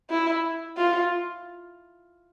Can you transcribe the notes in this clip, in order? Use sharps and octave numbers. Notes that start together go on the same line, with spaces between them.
E4
F4